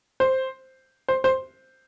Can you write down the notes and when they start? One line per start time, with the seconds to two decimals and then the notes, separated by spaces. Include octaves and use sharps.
0.20 C5
1.08 C5
1.24 C5